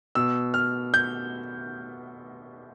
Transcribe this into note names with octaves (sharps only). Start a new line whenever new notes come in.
B2 E6
F6
G6